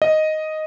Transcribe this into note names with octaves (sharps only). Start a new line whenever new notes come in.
D#5